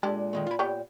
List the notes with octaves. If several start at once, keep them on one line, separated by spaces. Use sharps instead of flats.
A#2 G#3 D4 G4 A4
D#3 G#3 A3
F4 B5
G3 B3 C#5 G5